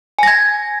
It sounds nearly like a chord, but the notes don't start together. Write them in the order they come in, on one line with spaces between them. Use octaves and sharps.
G#5 A#6 G#6